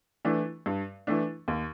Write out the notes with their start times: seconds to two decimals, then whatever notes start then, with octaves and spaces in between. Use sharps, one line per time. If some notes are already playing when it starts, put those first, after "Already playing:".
0.25 E3 A3 D4
0.66 G2
1.07 E3 A3 D4
1.48 D#2